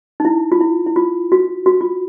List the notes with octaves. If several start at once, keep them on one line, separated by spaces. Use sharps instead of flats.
D#4
E4
F4
E4
E4
F4
F#4
F#4
F4